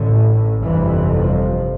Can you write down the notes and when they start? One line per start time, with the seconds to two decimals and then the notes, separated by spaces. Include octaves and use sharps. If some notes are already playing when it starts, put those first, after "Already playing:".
Already playing: A1 A2 D3
0.62 G1 F2 C3 E3
1.12 F3